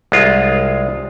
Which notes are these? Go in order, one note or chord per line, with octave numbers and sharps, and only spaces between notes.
C2 G#3 F4